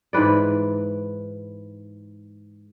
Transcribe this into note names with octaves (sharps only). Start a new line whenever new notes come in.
G#2 E3 B4 D5